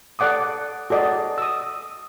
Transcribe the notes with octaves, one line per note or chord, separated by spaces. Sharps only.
A4 D5 F#5 D6 D#6
F#4 A4 D5 D#5
D#6 E6